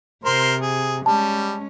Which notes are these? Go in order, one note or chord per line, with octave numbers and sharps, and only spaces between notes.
C3 A#4 C5 C6
G#4
G3 G#3 C#4 A5